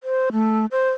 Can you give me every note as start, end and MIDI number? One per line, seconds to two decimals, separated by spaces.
0.04 0.29 72
0.32 0.66 57
0.72 0.90 72